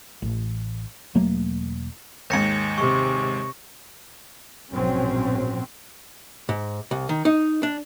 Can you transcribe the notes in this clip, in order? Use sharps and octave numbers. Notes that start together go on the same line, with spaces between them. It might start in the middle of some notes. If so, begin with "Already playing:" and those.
A1
E1 F#3 A3 A#3
D#2 G#2 G6 A#6 C#7
C3 C#6
A#1 G#2 B2 F#3 C4 C#4
G#2
C2
D#3
D#4
D4